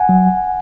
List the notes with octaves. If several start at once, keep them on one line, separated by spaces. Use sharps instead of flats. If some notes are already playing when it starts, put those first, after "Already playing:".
Already playing: F#5 G#5
F#3